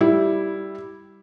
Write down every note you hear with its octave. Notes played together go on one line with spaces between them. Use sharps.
G3 E4